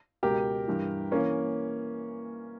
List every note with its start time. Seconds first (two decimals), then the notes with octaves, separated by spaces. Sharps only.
0.23 C#2 B2 G4 A#4
0.67 G2 E3
1.12 E3 A#3 C#4